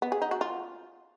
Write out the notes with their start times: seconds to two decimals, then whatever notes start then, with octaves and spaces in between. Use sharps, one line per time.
0.02 B3
0.12 G#4
0.22 D#4
0.31 F#4
0.41 F4